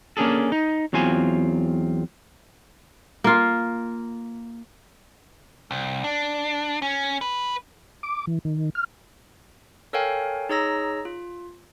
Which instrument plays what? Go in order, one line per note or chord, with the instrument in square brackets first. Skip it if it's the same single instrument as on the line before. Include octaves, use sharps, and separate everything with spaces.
[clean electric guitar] A#3 C#4 D4 G#4 A4
D#4
E2 F#3 C4 F4 G#5
[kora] A#3 F4
[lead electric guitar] C2
D4
C#4
B4
[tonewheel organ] D6
E3
D#3
F6
[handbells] A4 A#4 C#5 F5 G5 G#5
D#4 G#4 C#5 A#5 E6 A#6
F4